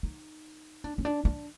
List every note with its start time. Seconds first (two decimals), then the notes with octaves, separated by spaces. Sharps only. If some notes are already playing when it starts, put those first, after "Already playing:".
0.03 D#4
0.84 D4
0.98 C#4
1.05 D4
1.25 D4